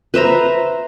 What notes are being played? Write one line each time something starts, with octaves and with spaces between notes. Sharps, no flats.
B4 C5 E5 A#5